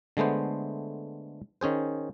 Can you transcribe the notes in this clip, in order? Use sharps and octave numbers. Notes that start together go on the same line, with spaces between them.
D3 G#3 A3 B3 C5
D#3 C#4 G#4 C5